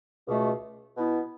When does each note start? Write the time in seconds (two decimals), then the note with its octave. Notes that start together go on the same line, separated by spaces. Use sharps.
0.27 C#2 B2 A3
0.95 B2 B3 E4